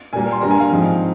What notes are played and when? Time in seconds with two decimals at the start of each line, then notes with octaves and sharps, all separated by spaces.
0.13 A#2 G3 A#3 G#5
0.32 C6
0.41 G2 G3 A#3 A#5
0.51 G#5
0.60 F5
0.70 G#2 F3 C4